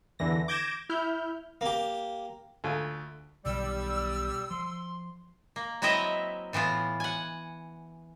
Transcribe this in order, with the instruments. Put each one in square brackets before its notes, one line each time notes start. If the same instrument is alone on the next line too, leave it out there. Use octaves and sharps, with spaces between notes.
[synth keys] E2 D3 E3 A#6
D6 G6 G#6 A#6 D7 E7
E4 F6 G6
[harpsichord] A#3 G4
[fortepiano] D2 A3 F4 G#5
[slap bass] B1 D#3 [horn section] G3 [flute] E6
[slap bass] F3 [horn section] C6
[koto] A#3
F#3 C4 E4 A#4 D#5 E5
A2 E3 B3 F4
F#5 G#5